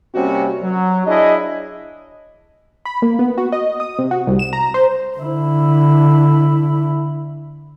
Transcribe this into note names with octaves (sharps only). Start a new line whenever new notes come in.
C3 G3 A#3 C4 C#4 F#4
F#3
D4 E4 G#4 C#5 D#5
B5
A#3
B3
F#4
D#5
D#6
C3
F#4
C2
E7
A#5
C5
D3 E4